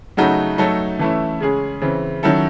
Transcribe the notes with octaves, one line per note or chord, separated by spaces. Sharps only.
C#3 F#3 A3 D#4 F#4
F#3 A3 D#4 A4
E3 A3 C#4 E4
C#3 G#3 C#4 G#4
C#3 E3 C4
D#3 F#3 C#4 E4 A4